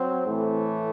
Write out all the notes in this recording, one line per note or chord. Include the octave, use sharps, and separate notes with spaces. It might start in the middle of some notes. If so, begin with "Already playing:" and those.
Already playing: F#3 C4
A2 E3 A3